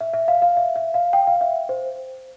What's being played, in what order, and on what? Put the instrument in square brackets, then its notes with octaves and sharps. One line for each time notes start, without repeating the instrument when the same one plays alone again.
[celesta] E5
E5
F5
F5
E5
E5
F5
G5
F5
E5
C5